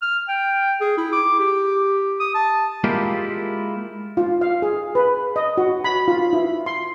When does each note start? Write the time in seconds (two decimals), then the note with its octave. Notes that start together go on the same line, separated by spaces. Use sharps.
0.02 F6
0.29 G5
0.80 G#4
0.97 E4
1.13 D6
1.39 G4
2.20 D#6
2.34 A5
2.84 G#3 A#3 E4 F4 G4
4.17 F4
4.41 F5
4.62 G#4
4.95 B4
5.36 D#5
5.58 F#4
5.84 B5
6.08 F4
6.33 E4
6.66 C6